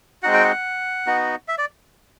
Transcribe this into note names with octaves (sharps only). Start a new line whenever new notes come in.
G#3 C4 D#4 F#4 F#5
G5
F#5
B3 D#4 F#4
E5
D5